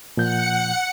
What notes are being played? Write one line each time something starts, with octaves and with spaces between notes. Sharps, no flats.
A#2 F3 F#5 G6 C#7